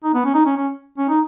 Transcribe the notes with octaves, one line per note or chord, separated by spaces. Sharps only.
D#4
B3
C#4
D#4
C#4
C#4
C#4
D#4